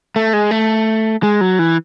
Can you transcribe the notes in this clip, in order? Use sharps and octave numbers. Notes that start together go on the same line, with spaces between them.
A3
G#3
A3
G#3
F#3
E3